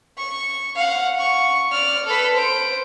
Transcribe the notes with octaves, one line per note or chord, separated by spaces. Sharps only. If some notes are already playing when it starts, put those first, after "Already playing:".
C#6
F5 F#5
C#6
D5 F6
A4 B4
C5 D7